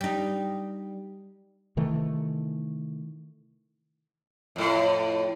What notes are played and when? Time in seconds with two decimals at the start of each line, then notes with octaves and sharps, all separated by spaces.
0.01 G3 D#4
1.77 C3 D#3 E3 A3
4.56 F2 A2